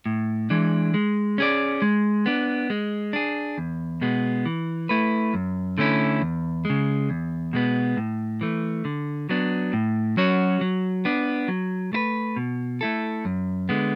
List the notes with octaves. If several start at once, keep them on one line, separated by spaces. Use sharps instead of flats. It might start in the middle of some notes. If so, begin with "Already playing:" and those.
A2
E3 G#3 D4
G#3
C#4 G#4 D5
G#3
B3 D4
G#3
D4 G#4
E2
B2 G#3 B3
E3
A3 E4 B4
F#2
D3 A3 C#4 E4
E2
C#3 G#3
E2
B2 G#3 B3
A2
E3 A3
D3
F#3 B3 D4
A2
F#3 C#4 F#4 C#5
F#3
B3 D4
F#3
A3 E4 B4
B2
A3 E4 A4
F#2
D3 G#3 B3